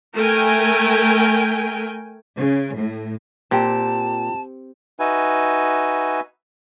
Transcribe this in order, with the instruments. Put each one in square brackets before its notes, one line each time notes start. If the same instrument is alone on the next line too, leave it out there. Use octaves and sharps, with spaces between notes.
[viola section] A3 A#4 G5 G#5
[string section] C#3
A2
[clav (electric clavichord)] A#2 [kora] C4 G4 [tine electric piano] F4 G5 [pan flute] A5
[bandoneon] D#4 F#4 B4 E5 G#5